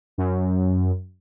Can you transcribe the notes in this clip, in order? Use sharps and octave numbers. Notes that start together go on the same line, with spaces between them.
F#2